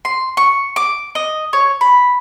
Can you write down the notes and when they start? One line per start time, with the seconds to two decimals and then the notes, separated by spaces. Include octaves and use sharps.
0.05 C6
0.37 C#6
0.76 D6
1.15 D#5
1.53 C#5
1.81 B5